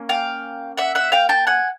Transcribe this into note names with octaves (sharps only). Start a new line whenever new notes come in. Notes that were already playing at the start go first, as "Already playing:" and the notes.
Already playing: A#3 C#4
F5 G5
E5 F#5
E5 F#5
F5 G5
G5 A5
F#5 G#5